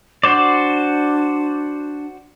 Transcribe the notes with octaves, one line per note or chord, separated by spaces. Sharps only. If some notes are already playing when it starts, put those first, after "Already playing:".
D4 F#4 C5 D5